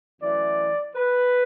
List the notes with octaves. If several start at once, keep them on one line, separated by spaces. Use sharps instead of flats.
F#2 E3 A3 D5
B4